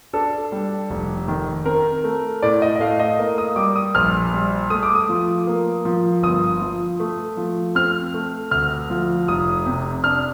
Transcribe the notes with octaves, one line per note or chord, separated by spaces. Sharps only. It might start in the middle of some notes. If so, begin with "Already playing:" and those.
D4 A4
G3
F1
D#3
C4 A#4
A3
A2 D5
D#5
D#5
A3 F5
D#5
A#3
D#6
G3 D6
D#6
A#1 F6
G3
A3 D#6
D6
D#6
F3
A#3
F3
G1 D#6
F3
A3
F3
C4 F6
A3
D2 F6
F3
F1 D#6
C3
D4 F6